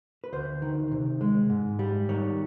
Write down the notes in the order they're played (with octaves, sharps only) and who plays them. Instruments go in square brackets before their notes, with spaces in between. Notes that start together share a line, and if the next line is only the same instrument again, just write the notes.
[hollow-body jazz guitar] B4
D2 C5
D#3
C3
G#3
G#2
G3
D#3 C#5